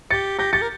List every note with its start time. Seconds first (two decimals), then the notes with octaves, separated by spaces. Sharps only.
0.10 G4 A6 C#7
0.38 G4 G6 A#6
0.53 G4 A6 C#7
0.61 A#4